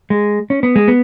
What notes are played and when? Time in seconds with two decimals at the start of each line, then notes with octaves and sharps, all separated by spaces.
0.10 G#3
0.50 C#4
0.63 B3
0.76 G#3
0.88 B3